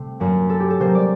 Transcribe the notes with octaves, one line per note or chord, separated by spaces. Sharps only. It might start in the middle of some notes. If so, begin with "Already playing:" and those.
Already playing: C3 A3 C4
F#2 F#3 A#3
A4
G4
A4
C3 F#3 A#3 C5
D5